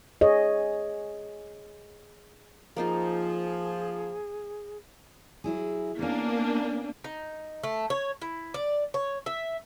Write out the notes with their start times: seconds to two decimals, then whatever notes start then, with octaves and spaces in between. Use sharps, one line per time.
0.21 G#4 C#5 D#5
2.76 F3 A#3 D#4 F4 G#4
5.44 F#3 E4 G#4
5.99 A#3 B3 C#4 D4
7.04 D#4
7.63 A3
7.90 C#5
8.22 E4
8.54 D5
8.94 C#5
9.26 E5